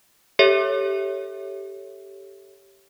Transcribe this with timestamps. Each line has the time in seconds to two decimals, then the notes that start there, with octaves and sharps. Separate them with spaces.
0.39 G4 A4 C#5 E5